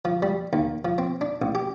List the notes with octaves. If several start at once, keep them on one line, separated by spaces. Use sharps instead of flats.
F3
G3
D#2
F3
C4
D4
A1
G4